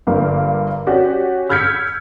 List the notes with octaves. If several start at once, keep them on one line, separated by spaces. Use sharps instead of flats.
G1 G2 A#3 F5
C#4 F#4 G4 D5
E6 F6 G6 G#6 B6 C#7